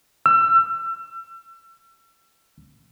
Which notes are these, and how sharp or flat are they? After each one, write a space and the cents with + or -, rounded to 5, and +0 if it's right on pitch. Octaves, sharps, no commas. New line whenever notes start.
E6 +35